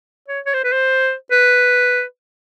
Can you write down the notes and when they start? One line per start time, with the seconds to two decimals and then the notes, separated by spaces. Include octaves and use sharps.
0.28 C#5
0.46 C#5
0.54 C5
0.64 B4
0.73 C5
1.32 B4